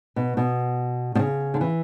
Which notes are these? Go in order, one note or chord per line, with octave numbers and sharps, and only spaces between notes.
B2
B2
B2
C#3
D3
E3